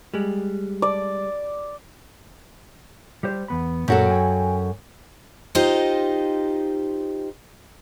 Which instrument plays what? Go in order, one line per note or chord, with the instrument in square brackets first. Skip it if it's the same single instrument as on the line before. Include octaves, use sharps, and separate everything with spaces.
[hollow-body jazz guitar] G3 G#3
[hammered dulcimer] D5
[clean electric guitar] G3 G4 C5
E2 B3 B5
[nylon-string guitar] F#2 F#4 A4 [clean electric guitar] A#2 F#3 A#3
[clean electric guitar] G5 G#5
[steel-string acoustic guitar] D#4 F4 G4 C5 D#5